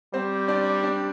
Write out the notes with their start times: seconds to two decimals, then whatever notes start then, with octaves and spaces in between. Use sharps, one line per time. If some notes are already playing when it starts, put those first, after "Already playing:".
0.14 G3 C4 C5
0.48 D4 D5
0.83 D4 D5